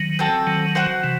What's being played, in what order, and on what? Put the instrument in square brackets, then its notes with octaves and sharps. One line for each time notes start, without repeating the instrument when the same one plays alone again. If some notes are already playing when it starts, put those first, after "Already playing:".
Already playing: [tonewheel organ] D#3 F#3
[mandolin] C4 F#4 A4
[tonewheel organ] D#3 F#3
[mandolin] F#4 C5 F#5
[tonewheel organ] C3 E3